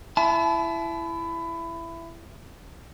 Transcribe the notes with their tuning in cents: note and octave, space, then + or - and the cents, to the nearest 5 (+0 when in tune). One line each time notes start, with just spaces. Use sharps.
E4 +20 A5 -35